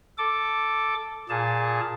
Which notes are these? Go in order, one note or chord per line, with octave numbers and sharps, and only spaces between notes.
A4 D6
A#2 G#4 A5